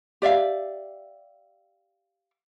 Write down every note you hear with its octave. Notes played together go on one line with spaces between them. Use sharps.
G4 D5 E5 F5